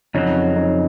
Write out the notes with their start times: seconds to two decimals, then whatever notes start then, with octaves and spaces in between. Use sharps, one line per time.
0.14 F2 C#3 F#3 C#4 D#4
0.56 C#4 D#4